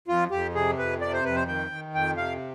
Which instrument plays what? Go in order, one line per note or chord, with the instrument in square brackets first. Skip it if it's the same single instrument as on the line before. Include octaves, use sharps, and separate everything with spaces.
[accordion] F2 F4
F2 G4
C3 G#4
F2 B4
C3 D5
C5
F2 B4
C5
D#3 G5
D#3
F2 G5
C3 F5